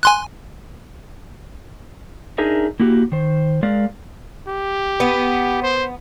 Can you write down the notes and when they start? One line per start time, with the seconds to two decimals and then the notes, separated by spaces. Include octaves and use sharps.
0.03 G#5 C6 F#6
2.38 D4 D#4 G#4 A#4 D#5 E5
2.80 A#3 E4 F#4 G4
3.12 D#3 C5
3.63 G#3 A#4 D5 F5
4.48 G4
5.00 B3
5.63 C5